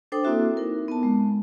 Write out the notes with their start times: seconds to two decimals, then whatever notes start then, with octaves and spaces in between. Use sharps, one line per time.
0.12 D4 A4 C5 G5 D6 D#6
0.24 A#3 C4 E4 F#4 E5
0.57 D#4 A#4
0.88 B3 A5
1.03 G#3